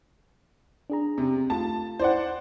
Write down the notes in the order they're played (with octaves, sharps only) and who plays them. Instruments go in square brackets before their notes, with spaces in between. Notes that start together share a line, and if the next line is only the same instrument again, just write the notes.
[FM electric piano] D4 G#4 A#5
[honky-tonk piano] C3
[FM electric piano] A3 F4 [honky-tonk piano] A5
[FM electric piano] E4 [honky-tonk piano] C5 D5 F#5